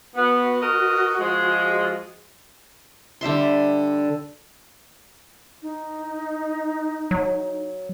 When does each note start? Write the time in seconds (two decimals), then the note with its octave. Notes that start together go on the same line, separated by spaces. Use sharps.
0.16 B3 F#4
0.62 A#4 B4 D#5
1.19 F3 G#3
3.21 D3 G3 E5 C6
5.62 D#4
7.11 F#3